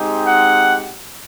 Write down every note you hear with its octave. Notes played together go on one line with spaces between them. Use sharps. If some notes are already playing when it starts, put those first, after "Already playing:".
Already playing: G#3 C4 D#4 G4
F#5